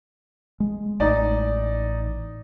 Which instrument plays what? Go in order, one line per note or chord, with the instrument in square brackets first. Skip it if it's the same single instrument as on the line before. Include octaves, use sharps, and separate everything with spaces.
[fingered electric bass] G#3
[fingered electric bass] A1 [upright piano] D#4 D5